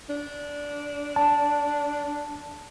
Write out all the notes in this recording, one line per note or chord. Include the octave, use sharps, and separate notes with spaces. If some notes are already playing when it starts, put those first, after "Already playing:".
D4
A5